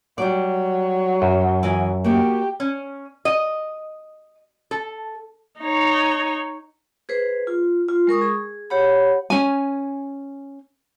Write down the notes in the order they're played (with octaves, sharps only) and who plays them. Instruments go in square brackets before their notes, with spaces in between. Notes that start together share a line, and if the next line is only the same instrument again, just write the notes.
[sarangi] F#3 [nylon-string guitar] G3 D5
[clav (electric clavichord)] F#2
[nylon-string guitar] E3 D#5 G#5
[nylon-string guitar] A#3 F#4 [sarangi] G4
[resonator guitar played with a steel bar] C#4
D#5
A4
[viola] D#4 C#5
[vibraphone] G#4 B4 C5
F4
F4
G#3 A#4 C#6 D#6
G#4
G4 C#5 F#5 B5
[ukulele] C#4 G#5